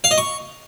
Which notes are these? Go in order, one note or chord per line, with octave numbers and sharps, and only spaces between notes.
F5
D#5
C#6